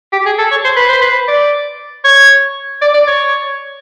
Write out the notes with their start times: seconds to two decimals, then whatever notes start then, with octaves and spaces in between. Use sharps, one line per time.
0.12 G4
0.26 G#4
0.38 A4
0.51 C#5
0.64 C5
0.76 B4
0.89 C5
1.01 B4
1.28 D5
2.04 C#5
2.81 D5
2.94 D5
3.07 C#5